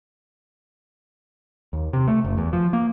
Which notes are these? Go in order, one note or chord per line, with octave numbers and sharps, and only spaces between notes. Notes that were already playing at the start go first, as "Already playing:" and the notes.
D#2
C3
A3
F#1
E2
F3
A#3